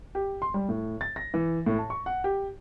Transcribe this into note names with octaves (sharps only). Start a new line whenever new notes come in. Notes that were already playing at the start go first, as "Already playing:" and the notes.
G4
C6
G3
A2
A6
A#6
E3
A2
A5
C#6
F#5
G4